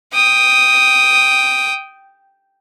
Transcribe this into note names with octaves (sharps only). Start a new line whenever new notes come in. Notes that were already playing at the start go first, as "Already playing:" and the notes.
G5 D#6